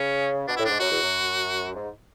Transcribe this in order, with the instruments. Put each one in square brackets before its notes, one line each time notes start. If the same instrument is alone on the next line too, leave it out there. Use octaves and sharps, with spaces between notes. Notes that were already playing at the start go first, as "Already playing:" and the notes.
Already playing: [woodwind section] C#3 [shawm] C#4
[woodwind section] B2 [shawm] D4
[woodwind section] A2 [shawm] E4
[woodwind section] G#2 [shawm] D4
[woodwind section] F#2 [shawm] F#4
[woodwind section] E2
F#2
G#2